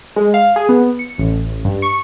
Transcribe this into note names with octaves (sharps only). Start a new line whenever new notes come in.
G#3
F5
G#4
B3
C#7
A1
G2
C#6